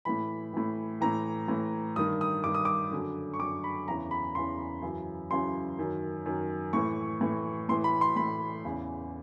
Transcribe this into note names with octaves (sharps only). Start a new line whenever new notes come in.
A2 E3 B5
A2 E3
A2 E3 A#5
A2 E3
G2 D#3 D#6
D#6
G2 D#3 D6
D#6
D6
F#2 D3
C#6
F#2 D3 D6
B5
E2 C#3 E3 A#5
B5
E2 C#3 E3 C6
F#2 C#3 E3
F#2 C#3 E3 C6
F#2 D#3
F#2 D#3
A2 E3 C#6
A2 E3
A2 E3 C6
B5
C6
A2 E3 B5
E2 C#3 E3